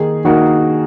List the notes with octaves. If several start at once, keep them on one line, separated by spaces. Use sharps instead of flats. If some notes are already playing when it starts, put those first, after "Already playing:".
Already playing: D#3 A#3 D#4 G#4
D#3 A#3 D#4 F#4